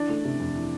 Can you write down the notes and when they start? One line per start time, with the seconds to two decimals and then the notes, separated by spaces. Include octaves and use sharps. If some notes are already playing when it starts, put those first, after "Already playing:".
Already playing: E3 D4
0.09 A3
0.25 C3
0.40 F2
0.55 E3